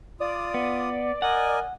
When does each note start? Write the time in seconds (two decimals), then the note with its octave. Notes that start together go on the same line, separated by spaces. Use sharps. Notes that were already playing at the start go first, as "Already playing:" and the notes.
0.20 F4 D5 D#6
0.54 B3
1.22 A#4 D#5 F#5 G#5